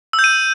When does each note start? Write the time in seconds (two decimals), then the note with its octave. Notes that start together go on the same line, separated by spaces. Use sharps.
0.13 E6
0.19 G6
0.24 D#7